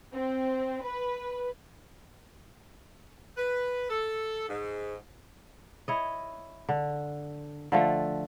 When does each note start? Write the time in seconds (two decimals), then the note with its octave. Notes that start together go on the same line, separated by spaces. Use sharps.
0.13 C4
0.84 B4
3.38 B4
3.90 A4
4.49 G#2
5.88 E4 C#5 D#5
6.69 D3
7.72 D3 F3 A3